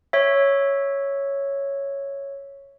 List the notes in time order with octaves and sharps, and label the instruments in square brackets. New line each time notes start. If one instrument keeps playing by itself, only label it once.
[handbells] C#5 E5